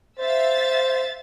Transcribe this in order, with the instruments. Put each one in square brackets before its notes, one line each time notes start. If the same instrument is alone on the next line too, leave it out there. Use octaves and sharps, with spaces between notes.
[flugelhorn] C5 [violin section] E5 F5 A6